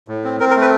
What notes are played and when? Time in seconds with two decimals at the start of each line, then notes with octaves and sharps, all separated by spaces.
0.08 A2
0.24 C4
0.40 C4 A#4
0.51 A#4
0.56 A3
0.61 B4